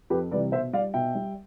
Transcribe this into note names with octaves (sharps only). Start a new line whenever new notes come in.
F2 G4 B4
C3 E3 G3 B4 D5
B2 C5 E5
G3 D5 F5
B2 E5 G5
G3